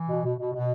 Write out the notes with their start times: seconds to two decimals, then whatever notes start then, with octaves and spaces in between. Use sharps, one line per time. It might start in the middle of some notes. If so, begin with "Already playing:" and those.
Already playing: E3
0.09 B2
0.24 B2
0.39 B2
0.54 B2